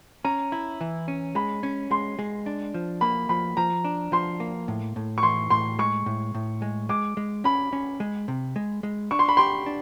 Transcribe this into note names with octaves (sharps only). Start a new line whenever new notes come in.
C#4 A#5
E4
E3
C#4
G#3 B5
C#4
G#3 C6
G#3
D4
F3
A#3 B5
F3 B5
F3 A#5
D4
F3 C6
A#3
A2
A2
C#6
E3 C6
A2 C6
G#3 C#6
A2
A2
G#3
G#3 D6
G#3
C#4 B5
C#4
G#3
C3
G#3
G#3
D4 C#6
C6
B5
G4 C6
D4